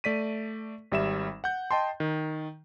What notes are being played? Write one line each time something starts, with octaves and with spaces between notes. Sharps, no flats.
A3 D5 B6 D#7
G#1 G3 E5 E7
F#5 G6
D#5 G5 A5 C6
D#3